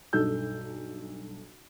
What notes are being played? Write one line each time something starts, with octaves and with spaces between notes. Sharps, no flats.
B1 G2 D#4 A4 E6 G6